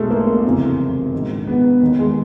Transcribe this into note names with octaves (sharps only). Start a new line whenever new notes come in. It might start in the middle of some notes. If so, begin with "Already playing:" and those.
Already playing: B1 B2 G#3 A3
A#3
F#1 F2 C3 E3
A#1 G#2 D#3
B3
D#2 D#3
G#3